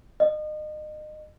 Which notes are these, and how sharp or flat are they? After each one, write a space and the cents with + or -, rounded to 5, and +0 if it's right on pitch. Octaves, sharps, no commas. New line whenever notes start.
D#5 -30